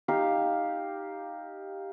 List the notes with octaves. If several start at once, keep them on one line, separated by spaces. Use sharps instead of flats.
D#4 G4 F5